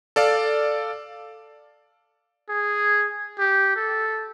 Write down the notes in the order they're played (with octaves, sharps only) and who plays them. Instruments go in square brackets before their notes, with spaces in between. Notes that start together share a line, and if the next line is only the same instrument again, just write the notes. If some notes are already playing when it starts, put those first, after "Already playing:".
[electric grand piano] A4 D5 F5
[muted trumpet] G#4
G4
A4